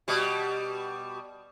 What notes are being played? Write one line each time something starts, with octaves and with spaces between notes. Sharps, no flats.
B2 G3